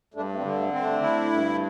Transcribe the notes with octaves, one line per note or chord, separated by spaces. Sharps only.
G2 A3 D4
A3
G3 C4
D3
A3
C4
A3 D4
E4
G2